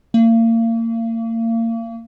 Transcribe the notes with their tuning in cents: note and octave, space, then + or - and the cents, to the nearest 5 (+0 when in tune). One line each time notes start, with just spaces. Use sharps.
A#3 -35